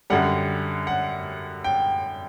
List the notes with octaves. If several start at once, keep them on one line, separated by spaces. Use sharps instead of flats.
F#2 D3 G3 F#5
F#5
G5